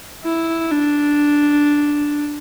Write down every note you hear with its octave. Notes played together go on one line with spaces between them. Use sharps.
E4
D4